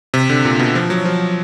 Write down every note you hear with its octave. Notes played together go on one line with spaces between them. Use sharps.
C3
D3
A#2
B2
F3
F#3
F3